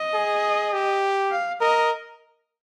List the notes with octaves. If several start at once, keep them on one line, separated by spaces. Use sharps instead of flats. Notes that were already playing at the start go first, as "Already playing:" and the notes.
Already playing: D#5
G#4
G4
F5
A#4 D#5